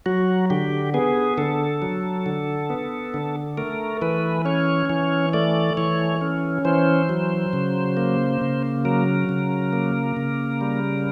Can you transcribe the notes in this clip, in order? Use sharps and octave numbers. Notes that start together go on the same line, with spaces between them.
F#3 F#4
D3 G4
B3 G#4
D3 A4
F#3
D3
B3
D3
A3 A#4
E3 B4
C#4 C#5
E3 C#5
A3 D5
E3 C#5
C#4
E3 C5
F#3
C#3
A#3
C#3
F#3 A#4
C#3
A#3
C#3
G3